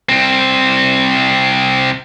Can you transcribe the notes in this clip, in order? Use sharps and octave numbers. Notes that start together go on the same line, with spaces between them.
C2 C4